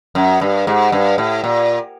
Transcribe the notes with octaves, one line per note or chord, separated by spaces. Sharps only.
F#2
G2
G#2
G2
A2
A#2